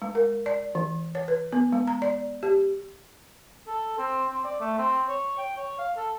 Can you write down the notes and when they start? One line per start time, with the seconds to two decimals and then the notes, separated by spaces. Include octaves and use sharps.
0.02 G#3
0.15 A#4
0.46 D5
0.75 E3
1.15 C#5
1.28 B4
1.53 B3
1.73 G#3
1.87 A#5
2.02 D5
2.43 G4
3.67 A4
3.98 C4
4.30 C4
4.45 D5
4.60 A3
4.78 C4
5.08 C#5
5.38 G5
5.57 C#5
5.79 F5
5.97 A4